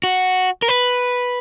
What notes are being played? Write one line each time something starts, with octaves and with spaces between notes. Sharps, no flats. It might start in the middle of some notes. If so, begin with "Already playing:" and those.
F#4
A#4
B4